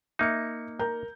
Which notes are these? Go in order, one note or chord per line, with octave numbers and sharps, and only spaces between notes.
A#3 D#4 E5 C#7
A#4 A#5 G6